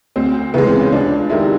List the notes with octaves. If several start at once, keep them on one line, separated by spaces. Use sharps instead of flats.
D2 C4
C#3 E3 G#3 B3
C4
C#4
C#2 D4
C3 D#3 G#3 E4